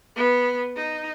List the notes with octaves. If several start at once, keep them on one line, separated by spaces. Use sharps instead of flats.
B3
D#4